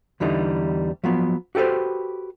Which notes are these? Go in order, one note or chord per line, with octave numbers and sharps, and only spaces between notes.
E2 D3 E3 G3 D#4
F3 F#3 B3
F#4 G4 A4 B4 C5